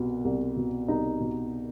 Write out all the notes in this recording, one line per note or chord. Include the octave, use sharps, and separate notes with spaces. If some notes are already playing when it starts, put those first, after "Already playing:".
Already playing: C2 B2
C2
B2
C2 D#4
B2